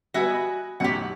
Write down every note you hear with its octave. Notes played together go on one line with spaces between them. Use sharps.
G3 B3 F#4 E5 G#5
D#5 B5
B1 F#2 A2 G4 F#5